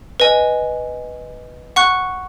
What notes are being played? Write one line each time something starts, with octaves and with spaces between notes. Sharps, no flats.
B4 D#5 G#5
F#5 C#6 F#6